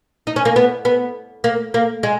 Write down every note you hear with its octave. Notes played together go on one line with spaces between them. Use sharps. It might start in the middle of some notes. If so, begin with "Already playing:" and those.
D#4
C#4
A#3
B3
B3
A#3
A#3
G#3